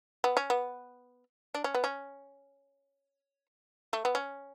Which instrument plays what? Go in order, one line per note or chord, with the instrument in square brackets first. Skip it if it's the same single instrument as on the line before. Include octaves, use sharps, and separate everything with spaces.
[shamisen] B3
C#4
B3
D4
C#4
B3
C#4
A3
B3
C#4